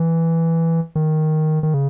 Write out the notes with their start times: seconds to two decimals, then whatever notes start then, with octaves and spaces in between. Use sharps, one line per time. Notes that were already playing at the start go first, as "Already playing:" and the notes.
Already playing: E3
0.95 D#3
1.63 D#3
1.74 C#3